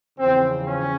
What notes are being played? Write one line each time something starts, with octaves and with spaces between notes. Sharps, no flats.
E2 C#3 F3 C4
C#4